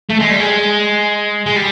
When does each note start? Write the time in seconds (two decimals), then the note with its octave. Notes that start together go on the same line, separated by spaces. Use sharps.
0.10 A3
0.20 G#3
0.31 G3
0.40 G#3
1.46 G#3
1.56 G3